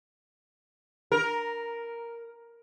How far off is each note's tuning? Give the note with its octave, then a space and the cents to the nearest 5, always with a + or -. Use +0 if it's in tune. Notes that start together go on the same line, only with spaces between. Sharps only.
A#4 +0